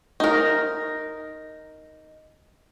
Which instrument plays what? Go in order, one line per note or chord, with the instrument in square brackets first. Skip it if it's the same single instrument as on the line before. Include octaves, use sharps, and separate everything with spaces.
[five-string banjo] D#4 A#4